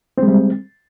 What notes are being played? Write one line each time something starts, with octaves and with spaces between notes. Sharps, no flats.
G3 G#3 C4